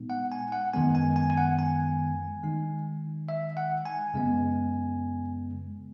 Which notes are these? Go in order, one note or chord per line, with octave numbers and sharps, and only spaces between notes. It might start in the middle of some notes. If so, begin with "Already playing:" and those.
Already playing: A#2 G#3 B3 D#4
F#5
G#5
F#5
F#2 D#3 G#3 B3 G#5
G#5
G#5
G#5
F#5
G#5
D#3 G#3 D#4
E5
F#5
G#5
F#2 C#3 G#3 B3